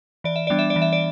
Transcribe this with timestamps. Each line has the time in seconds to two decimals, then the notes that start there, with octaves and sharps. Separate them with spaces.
0.24 E3 D5
0.36 E5
0.47 G3 B3 D4 D5
0.59 E5
0.70 D5
0.76 E3
0.82 E5
0.93 D5